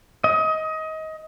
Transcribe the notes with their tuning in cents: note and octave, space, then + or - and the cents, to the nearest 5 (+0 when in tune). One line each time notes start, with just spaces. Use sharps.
D#5 +25